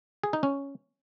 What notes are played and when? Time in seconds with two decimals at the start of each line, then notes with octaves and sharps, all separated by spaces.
0.24 G#4
0.33 D#4
0.43 C#4